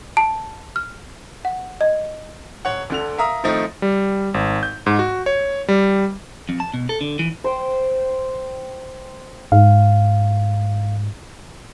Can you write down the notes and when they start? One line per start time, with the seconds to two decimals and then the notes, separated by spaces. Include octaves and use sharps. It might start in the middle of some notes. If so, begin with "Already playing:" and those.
0.17 A5
0.76 F6
1.45 F#5
1.81 D#5
2.65 D#1 C#5 F#5
2.90 D2 D3 F7
3.18 A#4 E5 F5 A#5 D#6 E6
3.44 D#3 F3 A3 C4 D#4 E4
3.82 G3
4.34 G#1
4.63 G6
4.86 G#2
4.99 F#4
5.26 C#5
5.68 G3
6.49 F2
6.60 A5
6.74 B2
6.89 A4
7.01 D3
7.19 E3
7.44 C5 G5
9.52 G#2 F5